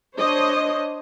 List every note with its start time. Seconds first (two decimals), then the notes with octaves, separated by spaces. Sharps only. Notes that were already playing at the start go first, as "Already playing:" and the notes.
0.17 D4 C5 C#5 D#5